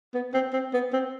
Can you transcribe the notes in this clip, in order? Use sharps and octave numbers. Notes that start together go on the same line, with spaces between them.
B3
C4
C4
B3
C4